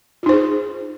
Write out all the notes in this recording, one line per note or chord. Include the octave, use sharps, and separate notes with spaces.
D#4 F4 G#4 C5